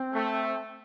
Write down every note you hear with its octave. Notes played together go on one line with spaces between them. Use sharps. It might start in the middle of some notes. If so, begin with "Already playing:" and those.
Already playing: C4
A3